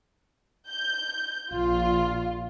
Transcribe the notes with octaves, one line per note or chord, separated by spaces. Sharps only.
G6
A#1 F4